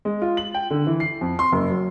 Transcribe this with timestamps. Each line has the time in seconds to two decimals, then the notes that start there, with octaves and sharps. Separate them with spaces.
0.05 G#3
0.22 F4
0.37 F#7
0.54 G5
0.71 D3
0.87 E3
1.00 C7
1.21 F2
1.39 C6
1.52 F#1
1.69 F#3